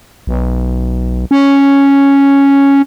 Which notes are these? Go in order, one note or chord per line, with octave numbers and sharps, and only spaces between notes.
B1
C#4